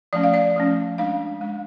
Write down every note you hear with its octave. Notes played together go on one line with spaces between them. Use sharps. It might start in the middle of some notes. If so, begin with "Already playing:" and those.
F3 A3 C#4 D5
F5
D5
F3 A3 C#4
G#3 D4 F5
G#3 D4